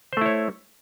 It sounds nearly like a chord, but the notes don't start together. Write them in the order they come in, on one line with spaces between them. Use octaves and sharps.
C5 A3 E4 C#5